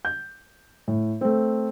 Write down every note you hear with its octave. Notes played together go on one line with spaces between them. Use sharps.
G6
A2
A3 C4